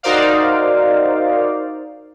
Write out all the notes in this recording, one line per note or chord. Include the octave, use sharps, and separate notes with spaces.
D#4 F#4 A#4 C5 D5 F5